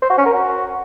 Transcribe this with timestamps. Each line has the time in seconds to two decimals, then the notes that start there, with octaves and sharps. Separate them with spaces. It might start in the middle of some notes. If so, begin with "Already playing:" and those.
0.02 C5
0.10 F#4
0.18 C#4
0.26 A#4
0.33 F#4